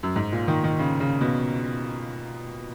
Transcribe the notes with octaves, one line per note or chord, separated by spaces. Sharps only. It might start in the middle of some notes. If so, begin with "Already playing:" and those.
F#2
G#2
A#2
D#3
D#3
C#3
C#3
B2